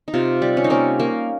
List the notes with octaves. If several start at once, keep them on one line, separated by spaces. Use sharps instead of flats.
D#4
C3 F4
G3
C#4
D#4
A#3 C#4
A#3